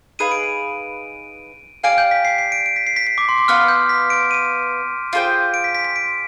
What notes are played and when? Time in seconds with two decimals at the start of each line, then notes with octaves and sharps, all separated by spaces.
0.19 D#4 G#4 B4 F5 D#7
0.31 D7
0.44 D#7
1.84 G4 D5 F5 G#5 D7
1.98 G6
2.11 B6
2.25 C7
2.38 C7
2.52 D7
2.66 D7
2.76 B6
2.87 C7
2.96 B6
3.07 B6
3.18 D6
3.28 C6
3.38 D6
3.48 B3 F4 B4 F6
3.68 G6
3.89 B6
4.10 D7
4.31 D#7
5.13 F4 G#4 C5 G5
5.54 D7
5.64 B6
5.75 B6
5.85 B6
5.96 D7